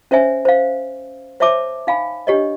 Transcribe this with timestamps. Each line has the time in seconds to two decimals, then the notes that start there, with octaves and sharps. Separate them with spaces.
0.11 C#4 C5 C#5 E5 G#5
0.45 C5 F5
1.40 C5 C#5 E5 A5 D6
1.87 D#4 F5 G#5 B5
2.27 D4 G4 C#5 D#5